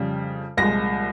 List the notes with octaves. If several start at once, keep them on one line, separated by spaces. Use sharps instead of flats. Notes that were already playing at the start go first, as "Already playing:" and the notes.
Already playing: F2 C#3 G3
C2 A#2 F3 G#3 A#6